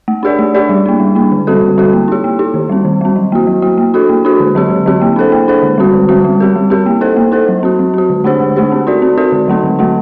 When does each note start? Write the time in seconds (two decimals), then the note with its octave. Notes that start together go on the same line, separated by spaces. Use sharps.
0.08 A3
0.23 D4 G4 A#4 D5
0.39 A3
0.55 D4 G4 A#4 D5
0.69 G3
0.86 A#3 D4
1.00 G3
1.15 A#3 D4
1.32 D3
1.47 G3 C4 F#4 A4
1.62 D3
1.78 G3 C4 F#4 A4
1.93 A#3
2.08 D#4 G4
2.24 A#3
2.39 D#4 G4
2.54 D#3
2.69 G3 C4
2.85 D#3
3.01 G3 C4
3.16 F#3
3.32 A#3 F#4
3.47 F#3
3.62 A#3 F#4
3.78 A#3
3.94 D4 F#4 A4
4.09 A#3
4.25 D4 F#4 A4
4.40 D3
4.55 F#3 C4 G4
4.70 D3
4.86 F#3 C4 G4
5.02 A#3
5.16 D4 A4 C5
5.32 A#3
5.48 D4 A4 C5
5.63 D3
5.78 G3 C4 F#4
5.93 D3
6.09 G3 C4 F#4
6.25 G3
6.40 C4 G4 A#4
6.56 G3
6.70 C4 G4 A#4
6.86 A#3
7.01 D#4 A4 C5
7.17 A#3
7.32 D#4 A4 C5
7.48 F#3
7.63 C4 F#4
7.79 F#3
7.94 C4 F#4
8.10 D3
8.24 A3 D4 G4 C5
8.40 D3
8.56 A3 D4 G4 C5
8.72 C4
8.87 D#4 F#4 A#4 D5
9.02 C4
9.17 D#4 F#4 A#4 D5
9.32 D3
9.48 F#3 A3 C4 D#4
9.64 D3
9.79 F#3 A3 C4 D#4